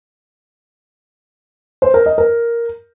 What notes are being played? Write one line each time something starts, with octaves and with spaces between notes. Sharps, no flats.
C5
A#4
D#5
A#4